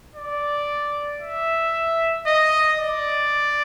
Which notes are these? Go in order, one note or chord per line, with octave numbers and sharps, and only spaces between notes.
D5
E5
D#5
D5